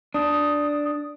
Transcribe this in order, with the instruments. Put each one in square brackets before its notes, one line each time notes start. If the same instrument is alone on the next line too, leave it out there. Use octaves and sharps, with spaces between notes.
[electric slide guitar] D4 [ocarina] D#6